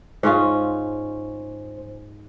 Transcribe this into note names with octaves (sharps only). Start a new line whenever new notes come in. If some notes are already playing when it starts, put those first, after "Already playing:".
G#2 C#4 F4 C5